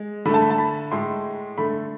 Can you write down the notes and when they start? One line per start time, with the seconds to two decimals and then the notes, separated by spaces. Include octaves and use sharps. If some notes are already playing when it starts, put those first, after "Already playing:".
Already playing: G#3
0.25 D3 B5
0.29 A3 A5
0.42 B5
0.50 A5
0.58 B5
0.91 A2 G#3 C6
1.57 D3 A3 B5